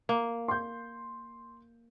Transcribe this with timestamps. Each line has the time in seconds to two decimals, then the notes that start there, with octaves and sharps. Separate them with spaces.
0.09 A#3
0.48 C6 G6